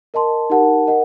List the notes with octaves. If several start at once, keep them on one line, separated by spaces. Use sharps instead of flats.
A#4 D#5 A5 C6
D#4 G4 A#4 F#5 A5
A#4 D#5 F#5